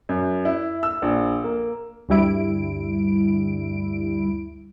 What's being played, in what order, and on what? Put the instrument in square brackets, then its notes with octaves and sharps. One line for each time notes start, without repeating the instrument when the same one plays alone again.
[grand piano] F#2
E4
E6
A#1
A#3
[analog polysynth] D2 G2 G3 E4 D7